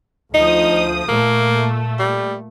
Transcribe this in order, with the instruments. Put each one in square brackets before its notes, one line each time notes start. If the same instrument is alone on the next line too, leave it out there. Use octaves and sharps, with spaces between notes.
[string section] D2 F3 D#6 [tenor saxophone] D#4
[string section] A#2 A3 [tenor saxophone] A#3
[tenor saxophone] G3